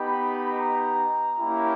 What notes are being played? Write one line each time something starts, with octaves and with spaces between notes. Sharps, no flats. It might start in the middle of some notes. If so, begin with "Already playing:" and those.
Already playing: B3 D#4 G4 B5
A#5
A#3 C#4 E4 G4